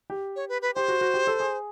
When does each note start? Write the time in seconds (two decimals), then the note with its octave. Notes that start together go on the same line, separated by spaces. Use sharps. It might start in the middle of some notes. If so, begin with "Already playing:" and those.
0.10 G4
0.36 C#5
0.49 B4
0.62 B4
0.75 G4 C5
0.88 F#4
1.01 F#4
1.14 G4
1.27 A4
1.40 G#4